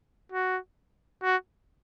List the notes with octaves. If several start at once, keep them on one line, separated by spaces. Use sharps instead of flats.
F#4
F#4